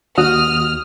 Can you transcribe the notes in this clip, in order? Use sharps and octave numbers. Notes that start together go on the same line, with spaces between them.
D#2 F#4 D#6 F6